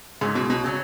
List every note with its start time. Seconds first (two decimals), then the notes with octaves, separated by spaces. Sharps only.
0.21 G#2 C#3 F#3 C#4
0.35 B2
0.50 B2
0.64 C#3 F#3 C#4